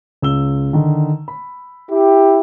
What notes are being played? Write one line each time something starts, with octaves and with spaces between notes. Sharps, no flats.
C#2 E6 G7
D3 D#3
B5
E4 G4